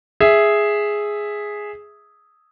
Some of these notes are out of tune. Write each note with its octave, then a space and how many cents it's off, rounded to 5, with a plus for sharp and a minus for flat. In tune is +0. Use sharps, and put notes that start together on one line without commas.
G#4 +0 E5 +0